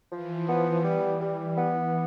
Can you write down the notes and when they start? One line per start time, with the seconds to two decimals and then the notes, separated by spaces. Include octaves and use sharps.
0.12 E3 F3
0.48 B3
0.84 G3
1.21 G3
1.57 E3 B3